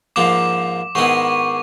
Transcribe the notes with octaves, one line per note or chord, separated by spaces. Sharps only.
G#2 F3 A#3 D4 D6
G#2 D#3 G#3 B3 E4 C#6